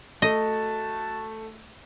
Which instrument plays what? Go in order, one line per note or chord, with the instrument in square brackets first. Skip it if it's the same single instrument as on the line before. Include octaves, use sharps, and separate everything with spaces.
[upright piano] A3 [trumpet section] F#4 A5 [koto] D#5